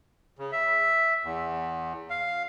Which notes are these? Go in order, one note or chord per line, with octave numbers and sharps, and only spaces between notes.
C#3
E5
E2
F5